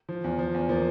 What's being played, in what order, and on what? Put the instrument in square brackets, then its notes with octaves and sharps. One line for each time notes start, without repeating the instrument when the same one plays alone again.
[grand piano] F3
E2
F3
E2
F3 A#3